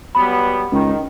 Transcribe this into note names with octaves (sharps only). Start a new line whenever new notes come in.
F#3 G3 B3 B5
C#2 D#3